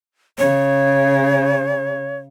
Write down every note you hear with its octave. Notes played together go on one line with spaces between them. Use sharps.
C#3 C#5